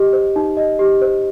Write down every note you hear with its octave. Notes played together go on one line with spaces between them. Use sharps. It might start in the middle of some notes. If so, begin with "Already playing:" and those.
Already playing: G4 D#5
C5
D#4
D#5
G4
C5